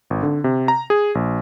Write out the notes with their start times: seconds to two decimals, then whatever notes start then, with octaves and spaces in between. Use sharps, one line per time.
0.10 G#1
0.23 D3
0.44 C3
0.68 A#5
0.90 G#4
1.15 A#1